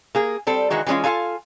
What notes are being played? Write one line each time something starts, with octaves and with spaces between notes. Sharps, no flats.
A#3 G#4
G3 C4 A4
D#3 E3 G#3 F#4
E3 G3 G#3 C#4 F4
F4 A4 F5 G#5